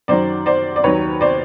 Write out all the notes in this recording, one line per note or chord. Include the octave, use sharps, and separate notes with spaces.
F#2 D#3 F#3 C5 D5
C5 D5
D5
D#2 D#3 F#3 B4 C#5
C5 D5